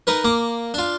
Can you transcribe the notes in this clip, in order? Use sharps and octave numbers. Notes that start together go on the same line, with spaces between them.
D#4 A#4 B4
A#3 A#5 D6
D4 F4